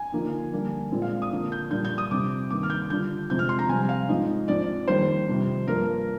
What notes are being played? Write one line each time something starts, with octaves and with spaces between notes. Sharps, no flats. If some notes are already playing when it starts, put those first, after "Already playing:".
Already playing: G#5
D3 F3 A#3 D#4
D3 G3 A#3 D4
A#2 G#3 C4 F4
F5
D#6
D3 F3 A#3 D4
G6
A#2 G3 D4 F4 G6
G6
D#6
C3 G3 C4 D6
G2 D#3 A#3 D6
F6
G6
D3 G3 D4 F4 G6
F2 C3 F3 G#3 G6
F6
C6
A#5
C3 G3 C4 G#5
F5
G#2 F3 G#3 D#4 D#5
G#2 F3 C4 D#4 D5
F2 D#3 G3 A#3 D4 C5
F2 C3 G3
G2 F3 A#3 D4 A#4